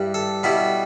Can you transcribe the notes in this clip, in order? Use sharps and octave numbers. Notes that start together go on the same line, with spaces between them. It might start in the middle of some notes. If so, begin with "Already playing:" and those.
Already playing: G2 G3 E4
A4
B2 G3 B3 E4